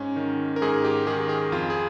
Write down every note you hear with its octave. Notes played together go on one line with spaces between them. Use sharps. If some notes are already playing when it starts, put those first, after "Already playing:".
Already playing: G#2 C#4
D#3
A#4
G#2 G#4
G4
D#3 G#4
G#4
F2 F4
G#4